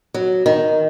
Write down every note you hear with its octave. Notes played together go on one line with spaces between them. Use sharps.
F#3
D#3